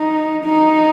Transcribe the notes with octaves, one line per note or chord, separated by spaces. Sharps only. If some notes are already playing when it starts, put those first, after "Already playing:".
Already playing: D#4
D#4